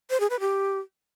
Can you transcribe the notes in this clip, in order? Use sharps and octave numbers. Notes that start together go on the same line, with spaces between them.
C5
G#4
B4
G4